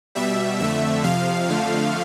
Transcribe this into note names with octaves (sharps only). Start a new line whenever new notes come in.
B2 G3 E5
F2 D3 A3 E5
F2 C3 F3 F5
F2 D3 F3 A3